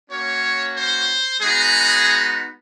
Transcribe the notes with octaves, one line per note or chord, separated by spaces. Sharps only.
A#3 C#4 F#4 C#5
C5
G#3 B3 D#4 F#4 G#4